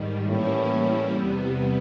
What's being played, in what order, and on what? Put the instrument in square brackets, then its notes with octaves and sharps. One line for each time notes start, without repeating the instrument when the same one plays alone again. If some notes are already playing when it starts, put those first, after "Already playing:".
Already playing: [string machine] G#2 D#3 G3
[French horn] A2 [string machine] E3 G3 A#3 C#4 E4
[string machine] E2 C3 E3 G3 B3